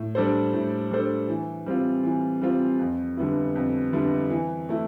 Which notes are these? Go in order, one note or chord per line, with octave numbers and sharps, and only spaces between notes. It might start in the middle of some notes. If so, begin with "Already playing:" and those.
Already playing: A2
G3 D4 A4 C5
A2
G3 D4 A4 C5
E3
G3 C4 F4
E3
G3 C4 F4
F2
D3 G3 B3 E4
F2
D3 G3 B3 E4
E3
A3 E4